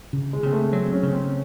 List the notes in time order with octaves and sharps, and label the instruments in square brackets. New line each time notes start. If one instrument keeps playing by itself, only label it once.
[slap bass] C#3
[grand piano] G#3
[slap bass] C#3 [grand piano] C4
[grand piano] A3
[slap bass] F#3 [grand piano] C4
[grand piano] C#4
[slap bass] C#3
[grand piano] C4